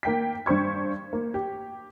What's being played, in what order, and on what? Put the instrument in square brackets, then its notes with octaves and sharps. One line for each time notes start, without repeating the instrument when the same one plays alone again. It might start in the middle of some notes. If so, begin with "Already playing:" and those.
[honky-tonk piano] A#3 G5 B6
G2 D4 C5 C#6 G#6
A#3
G4